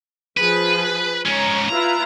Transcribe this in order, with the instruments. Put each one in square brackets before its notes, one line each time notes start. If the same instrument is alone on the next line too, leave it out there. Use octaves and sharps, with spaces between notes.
[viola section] F3 G#4 [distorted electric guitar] B4
[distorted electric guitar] G#2 C#4 [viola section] C#5 A#5
[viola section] E4 F4 B4 [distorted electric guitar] A#5